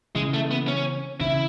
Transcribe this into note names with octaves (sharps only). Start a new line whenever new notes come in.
C#3 E3 G#3
A3
B3
C#4
C#3 E3 E4